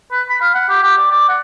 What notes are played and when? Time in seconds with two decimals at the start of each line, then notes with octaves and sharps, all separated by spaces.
0.11 B4
0.29 B5
0.42 F5
0.55 F#5
0.69 G4
0.83 G4
0.98 D5
1.10 D5
1.29 F#5